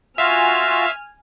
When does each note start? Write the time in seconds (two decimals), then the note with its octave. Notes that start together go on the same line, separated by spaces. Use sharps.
0.18 F4 F#4 E5 F5 G#5 F6